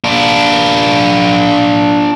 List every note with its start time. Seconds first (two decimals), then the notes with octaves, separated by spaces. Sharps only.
0.04 D4 F4